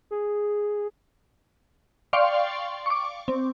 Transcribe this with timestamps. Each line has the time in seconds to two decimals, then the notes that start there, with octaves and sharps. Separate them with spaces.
0.11 G#4
2.13 D5 F5 G5 C6 C#6
2.86 C#6 D6
3.28 C4